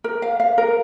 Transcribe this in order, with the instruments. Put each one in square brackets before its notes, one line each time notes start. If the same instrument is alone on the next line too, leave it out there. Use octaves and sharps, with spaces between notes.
[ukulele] A#4
F5
F5
A#4